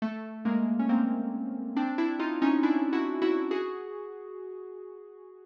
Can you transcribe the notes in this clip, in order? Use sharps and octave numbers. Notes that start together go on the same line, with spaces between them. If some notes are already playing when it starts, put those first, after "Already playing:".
A3
G#3 A#3
C#4
A#3 C4
C4 D4
D4 E4
D#4 F4
C#4 D#4
D4 E4
E4 F#4
E4 F#4
F#4 G#4